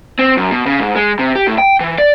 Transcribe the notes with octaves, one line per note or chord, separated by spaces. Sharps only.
C4
F#2
B2
C#3
G#2
G#3
C3
G4
A2
G5
E3
D5